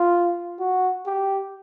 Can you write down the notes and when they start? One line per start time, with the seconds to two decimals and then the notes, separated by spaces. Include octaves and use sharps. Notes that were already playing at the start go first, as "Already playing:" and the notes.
Already playing: F4
0.59 F#4
1.06 G4